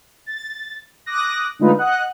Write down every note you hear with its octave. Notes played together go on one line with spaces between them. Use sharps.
A6
D6 D#6 F#6 A#6
D3 G#3 A3 D#4 F4 B4
D#5 F#5 F#6